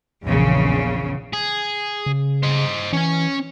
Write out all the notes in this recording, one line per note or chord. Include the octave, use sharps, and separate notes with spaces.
A#1 E2 C#3
G#4
C#3
C5 D#5
E3 C#4 G#5